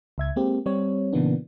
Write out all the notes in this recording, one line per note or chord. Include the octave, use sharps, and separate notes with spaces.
C#2 E5 G#6
G#3 A#3 C4 G4
G3 C4 C#5
A#2 C#3 E3 A#3 B3 D4